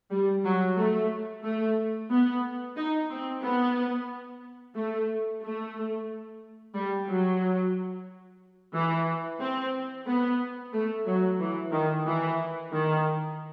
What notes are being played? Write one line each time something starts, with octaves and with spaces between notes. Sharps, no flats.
G3
F#3
A3
A3
B3
D#4
C4
B3
A3
A3
G3
F#3
E3
C4
B3
A3
F#3
E3
D#3
E3
D#3